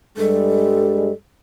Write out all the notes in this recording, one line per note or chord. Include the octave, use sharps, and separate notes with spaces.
G2 G3 G#3 A4